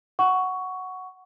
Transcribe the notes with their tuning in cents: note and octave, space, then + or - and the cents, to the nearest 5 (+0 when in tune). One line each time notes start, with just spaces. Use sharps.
F#5 +0 C#6 +10